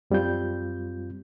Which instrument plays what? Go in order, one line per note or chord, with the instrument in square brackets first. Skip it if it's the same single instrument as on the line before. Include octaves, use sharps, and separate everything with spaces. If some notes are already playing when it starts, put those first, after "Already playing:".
[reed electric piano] F#2 G3 C4 F4 G6